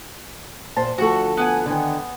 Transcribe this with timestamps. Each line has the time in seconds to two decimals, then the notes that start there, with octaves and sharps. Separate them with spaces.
0.77 A#2 C5 A5
0.98 D2 F3 F#4 A4
1.37 B3 F#5 G#5
1.66 D3 D#3